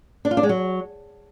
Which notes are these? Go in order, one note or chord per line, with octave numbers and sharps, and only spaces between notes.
D4
F4
D4
G#3
F#3